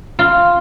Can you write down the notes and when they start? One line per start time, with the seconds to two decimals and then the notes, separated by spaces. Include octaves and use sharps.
0.19 F4